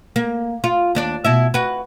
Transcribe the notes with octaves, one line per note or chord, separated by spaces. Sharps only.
A#3
F4
D#2 D4 D5
B2 E4 E5
F#4 B4